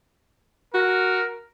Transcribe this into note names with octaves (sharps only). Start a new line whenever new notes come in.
F#4 A#4